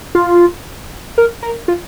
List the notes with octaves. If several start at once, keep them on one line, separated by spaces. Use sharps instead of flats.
F4
A#4
A#4
F4